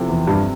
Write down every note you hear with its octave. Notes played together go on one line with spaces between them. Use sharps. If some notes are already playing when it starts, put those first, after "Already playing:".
Already playing: C3 F3 C4 E4 A4
E2
G2